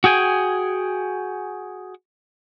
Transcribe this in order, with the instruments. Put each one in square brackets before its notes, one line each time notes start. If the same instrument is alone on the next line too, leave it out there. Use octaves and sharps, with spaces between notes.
[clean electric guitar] F#4 G#4 G5 G#5